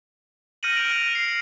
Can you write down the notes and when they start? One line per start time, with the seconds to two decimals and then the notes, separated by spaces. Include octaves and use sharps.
0.63 F6 G6 A#6 C#7 D#7 F#7
0.75 F6 D7 F7
0.92 F6
1.13 C7 D#7